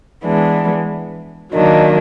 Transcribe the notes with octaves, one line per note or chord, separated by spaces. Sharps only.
E3 G#3 B3 D4
D#3 F#3 A#3 D4